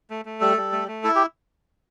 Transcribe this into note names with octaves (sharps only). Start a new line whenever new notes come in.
A3
A3
G3 A4
G3
A3
A3
E4 A4
G4